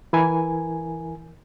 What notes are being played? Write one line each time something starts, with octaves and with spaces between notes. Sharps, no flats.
E3 E4 A#4 G#5